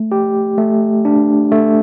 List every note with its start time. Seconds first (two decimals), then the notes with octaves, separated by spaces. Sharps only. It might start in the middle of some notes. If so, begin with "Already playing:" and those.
Already playing: A3
0.12 G4
0.58 A3
1.05 D4
1.52 A3